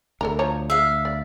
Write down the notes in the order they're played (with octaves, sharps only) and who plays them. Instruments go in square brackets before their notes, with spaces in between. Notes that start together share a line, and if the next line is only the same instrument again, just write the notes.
[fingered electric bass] D2 [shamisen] A4 A#4 A#5
[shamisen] F3 C#5 A#5
[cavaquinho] E5 F5
[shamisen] D5